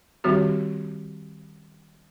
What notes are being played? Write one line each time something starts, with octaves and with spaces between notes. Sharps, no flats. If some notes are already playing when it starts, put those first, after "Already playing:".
D#3 G3 C4 F#4 G4